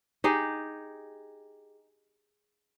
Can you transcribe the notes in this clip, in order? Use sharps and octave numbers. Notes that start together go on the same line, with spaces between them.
D#4 G4 G#4